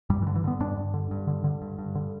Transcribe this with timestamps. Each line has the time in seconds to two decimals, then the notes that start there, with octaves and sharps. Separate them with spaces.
0.10 G2 G3
0.22 E3
0.27 D3
0.35 E3
0.44 D3 B3
0.60 G2 D4
0.77 G2
0.94 D3
1.11 G2
1.27 D3
1.44 D3
1.62 G2
1.79 G2
1.95 D3